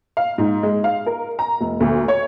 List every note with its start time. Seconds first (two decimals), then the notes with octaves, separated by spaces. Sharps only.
0.17 F5
0.38 G#2
0.63 G#3
0.84 F5
1.06 A#4
1.39 A#5
1.61 F1
1.80 D2
2.08 C#5